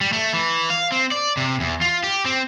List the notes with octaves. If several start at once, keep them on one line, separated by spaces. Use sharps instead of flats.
G3
A3
E3
F5
C4
D5
C3
E2
F4
G4
C4